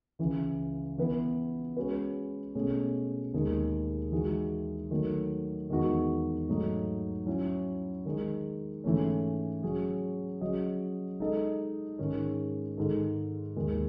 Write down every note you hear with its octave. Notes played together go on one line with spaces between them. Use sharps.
C#2 C#3 E3
E3 B3 E4 B4
G#3 C#4 F#4 B4
B2 A3 C#4 G#4
D#2 D#3 G#3 D#4 G#4
E3 G#3 D#4 F#4
D#3 F#3 A3
E2 D#3 G#3 D#4 F#4
G#2 F#3 A3 D#4
F#3 C#4 E4
D#3 G#3 D#4
G#2 E3 A3 C#4
F#3 C#4 G#4
F#3 C#4 G#4 D#5
G#3 D#4 A4 D#5
G#2 D#3 G#3 C#4
G#2 D#3 G#3 D#4 A4
D#2 D#3 G#3